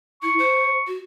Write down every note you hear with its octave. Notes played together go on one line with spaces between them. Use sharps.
E4 C#6
C5
F#4